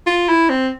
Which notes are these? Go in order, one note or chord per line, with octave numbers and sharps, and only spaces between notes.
F4
E4
C4